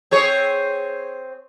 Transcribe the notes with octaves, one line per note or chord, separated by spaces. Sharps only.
C4 G#4 C#5